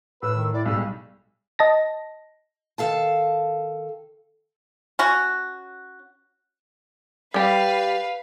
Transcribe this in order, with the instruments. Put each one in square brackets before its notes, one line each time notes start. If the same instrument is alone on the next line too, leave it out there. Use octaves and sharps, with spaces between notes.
[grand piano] A2 [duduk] B4 [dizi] E6
[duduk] D#3
[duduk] E4 [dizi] D5
[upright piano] B1 G#3 [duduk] G3 [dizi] E6
[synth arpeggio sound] D#5 A5 A#6
[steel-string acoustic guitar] D#3 A4 F5 A5
[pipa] C#4 F#4
[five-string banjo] G3 G4 [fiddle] B4 F5